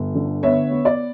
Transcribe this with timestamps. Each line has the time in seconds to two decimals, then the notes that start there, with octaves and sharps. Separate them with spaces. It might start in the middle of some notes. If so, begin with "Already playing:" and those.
Already playing: G1
0.15 D3
0.43 B3 C#5 E5
0.71 B3
0.85 D5